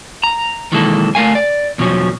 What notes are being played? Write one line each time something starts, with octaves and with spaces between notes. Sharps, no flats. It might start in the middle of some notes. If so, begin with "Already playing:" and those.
A#5
B1 D#3 E3 G#3 A#3 A4
A3 A#4 F5 G#5
D5
E2 B2 F3 F#3 C#4